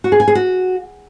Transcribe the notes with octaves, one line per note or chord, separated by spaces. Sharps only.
F#4
G#4
G#5
G#4
F#4